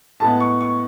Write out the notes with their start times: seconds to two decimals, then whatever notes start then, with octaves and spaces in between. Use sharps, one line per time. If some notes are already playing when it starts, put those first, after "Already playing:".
0.20 A2 G#3 B3 A5
0.40 C#6
0.61 C#6